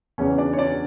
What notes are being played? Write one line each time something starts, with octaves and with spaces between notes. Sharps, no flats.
E2 C#3 E3 C#4 C#5
D4 D5
C#5
D4 D5